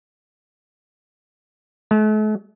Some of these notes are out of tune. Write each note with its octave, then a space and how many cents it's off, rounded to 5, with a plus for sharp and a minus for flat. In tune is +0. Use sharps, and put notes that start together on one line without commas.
A3 -45